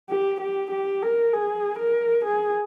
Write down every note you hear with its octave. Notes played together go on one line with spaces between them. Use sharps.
G4
G4
G4
A#4
G#4
A#4
G#4